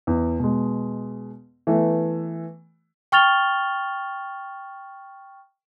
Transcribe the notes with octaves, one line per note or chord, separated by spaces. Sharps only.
E2
B2 G#3
E3 A3 B3
G5 C#6 F6 A6 F7 G7